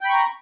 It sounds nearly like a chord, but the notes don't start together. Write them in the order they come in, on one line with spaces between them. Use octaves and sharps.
G5 B5 C#6 A#5